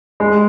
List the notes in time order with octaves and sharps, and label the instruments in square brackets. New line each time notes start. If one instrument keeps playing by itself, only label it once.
[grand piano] G#3